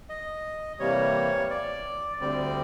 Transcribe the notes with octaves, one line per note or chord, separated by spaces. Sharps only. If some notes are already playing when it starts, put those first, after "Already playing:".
D#5
C3 E3 G3 A#3 C#5
D5
D2 D3 G3 C4 D5